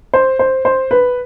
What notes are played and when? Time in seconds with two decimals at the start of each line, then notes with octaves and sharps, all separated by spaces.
0.14 C5
0.39 C5
0.65 C5
0.91 B4